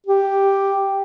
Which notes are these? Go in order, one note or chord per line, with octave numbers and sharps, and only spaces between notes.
G4